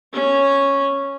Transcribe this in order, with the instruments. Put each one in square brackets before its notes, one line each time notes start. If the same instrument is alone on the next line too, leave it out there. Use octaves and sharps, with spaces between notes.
[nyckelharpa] C#4 C#5